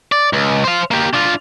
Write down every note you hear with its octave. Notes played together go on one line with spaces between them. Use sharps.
D5
C#2
C5 F5
A#3 G4
D4 F4